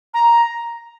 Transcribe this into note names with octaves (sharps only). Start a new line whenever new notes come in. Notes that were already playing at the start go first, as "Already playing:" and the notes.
A#5